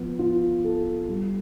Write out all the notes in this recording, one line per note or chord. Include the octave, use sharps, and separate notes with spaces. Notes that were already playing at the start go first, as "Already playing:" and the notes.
Already playing: F3 B3
F4
A4
G3